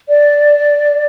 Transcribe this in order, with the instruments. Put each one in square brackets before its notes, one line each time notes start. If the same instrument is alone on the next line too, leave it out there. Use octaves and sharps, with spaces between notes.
[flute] D5